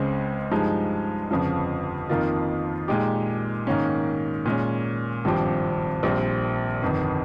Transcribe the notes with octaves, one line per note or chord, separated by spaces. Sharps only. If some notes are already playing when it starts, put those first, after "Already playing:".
Already playing: C#2 C#3 G#3 C4
G2 F3 G#3 D#4
G1 F2 C#3 F3
F2 D#3 A#3 F4
A#2 G#3 D#4 G4
G#2 D#3 A#3 C#4
A#2 G#3 C#4
G#1 G2 F3 C4 G4
A#1 A#2 G3 C4
G1 F2 D#3